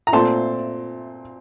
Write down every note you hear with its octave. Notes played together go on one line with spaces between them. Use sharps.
A#5
A#2 A3 C4 A5 C6